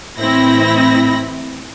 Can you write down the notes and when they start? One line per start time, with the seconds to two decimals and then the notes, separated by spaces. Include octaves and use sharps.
0.18 A2 E3 C4 E4 B5 A#6